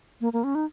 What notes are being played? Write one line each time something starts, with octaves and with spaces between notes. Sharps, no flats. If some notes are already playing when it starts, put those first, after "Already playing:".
A#3
A#3
C#4
D#4